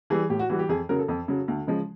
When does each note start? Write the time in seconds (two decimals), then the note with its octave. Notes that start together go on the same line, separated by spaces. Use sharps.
0.10 E3 G3 G#4
0.30 A2 G4
0.39 F#4
0.49 E3 G3 F#4
0.59 G4
0.69 F2 G#4
0.89 C#3 F#3 A#4
0.99 A4
1.08 F2
1.28 C#3 F#3
1.48 D2
1.67 C#3 F3 G#3